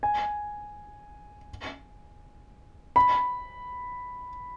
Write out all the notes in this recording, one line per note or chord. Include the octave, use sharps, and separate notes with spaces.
G#5
B5